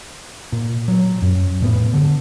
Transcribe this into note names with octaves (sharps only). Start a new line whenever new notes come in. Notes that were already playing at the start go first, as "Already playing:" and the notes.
A#2
F#3
F#2
F2 A2 B3
D3